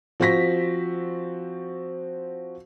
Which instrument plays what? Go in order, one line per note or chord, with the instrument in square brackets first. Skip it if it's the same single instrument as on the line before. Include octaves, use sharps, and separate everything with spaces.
[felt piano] F3 C4 F#4 A#6 B6